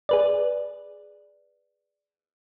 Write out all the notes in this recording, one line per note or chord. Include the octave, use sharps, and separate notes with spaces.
G#4 B4 D5